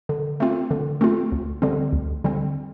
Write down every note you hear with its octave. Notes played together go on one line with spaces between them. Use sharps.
D3
A3 C4 F4
D3
A3 C4 F4
D2
D3 G3 C4
D2
D3 G3 C4